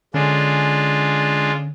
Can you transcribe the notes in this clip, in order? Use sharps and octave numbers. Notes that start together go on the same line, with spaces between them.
D3 G#3 C#4 D4 F4